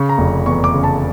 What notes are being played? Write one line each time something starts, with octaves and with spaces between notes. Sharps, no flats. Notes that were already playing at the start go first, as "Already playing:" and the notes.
Already playing: C#3 C#6
A#5
F1
E2 C#6
D6
C#3
A5